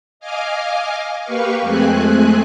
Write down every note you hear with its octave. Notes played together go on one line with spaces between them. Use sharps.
D#5 F5 G#5 D6 F6
A#3 G4 B4 F5 C#6
F2 G#3 A3 C4 G#5 F#6